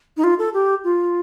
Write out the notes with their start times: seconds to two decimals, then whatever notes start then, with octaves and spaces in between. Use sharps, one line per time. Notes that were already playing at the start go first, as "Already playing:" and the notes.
0.17 D#4
0.24 F4
0.39 A4
0.54 G4
0.84 F4